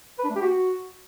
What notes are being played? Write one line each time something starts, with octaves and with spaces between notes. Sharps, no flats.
B4
D4
A3
G4
F#4